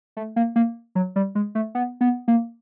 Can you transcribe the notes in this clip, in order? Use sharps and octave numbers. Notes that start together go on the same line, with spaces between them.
A3
A#3
A#3
F#3
G3
G#3
A3
B3
B3
A#3